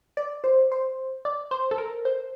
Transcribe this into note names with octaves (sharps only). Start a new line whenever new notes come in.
D5
C5
C5
D5
C5
A4
A#4
C5